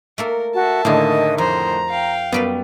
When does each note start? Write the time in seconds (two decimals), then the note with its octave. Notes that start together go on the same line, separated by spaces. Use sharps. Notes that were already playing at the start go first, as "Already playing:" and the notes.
0.18 A3 A#3 A4 A#4
0.55 F#4 E5 A5
0.85 A2 D3 D#3 A#3 D#4 G#4 D#5
1.38 F2 C5 A#5
1.89 F5 G5
2.32 F#2 G3 B3 B4